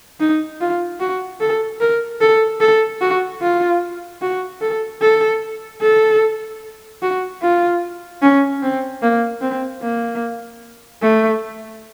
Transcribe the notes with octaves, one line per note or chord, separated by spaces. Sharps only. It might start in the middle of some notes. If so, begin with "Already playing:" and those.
D#4
F4
F#4
A4
A#4
A4
A4
F#4
F4
F#4
A4
A4
A4
F#4
F4
C#4
C4
A#3
C4
A#3
A3